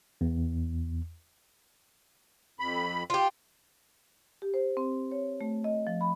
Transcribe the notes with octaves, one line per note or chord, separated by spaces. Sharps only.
E2
F2 B5
F4 G4
G4
C5
C4
C#5
A3
D#5
F3
B5